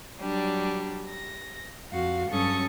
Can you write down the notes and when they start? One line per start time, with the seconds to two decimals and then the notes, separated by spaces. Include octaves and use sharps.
0.19 F#3 G3 D4
1.09 A#6
1.91 F2 F#4 F5
2.29 G2 F#3 C#4 A4 C#6 D#6